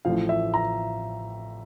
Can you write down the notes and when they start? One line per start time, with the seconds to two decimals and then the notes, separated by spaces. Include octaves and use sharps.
0.05 A1 A2 F3 F5
0.29 E5
0.54 A#5